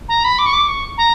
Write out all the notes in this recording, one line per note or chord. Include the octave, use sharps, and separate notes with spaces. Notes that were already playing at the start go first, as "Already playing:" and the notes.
A#5
B5
D6
C#6
D6
C#6
A#5